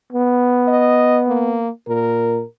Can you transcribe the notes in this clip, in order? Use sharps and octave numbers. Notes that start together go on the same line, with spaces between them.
B3
D#5
A#3
A#2 A#4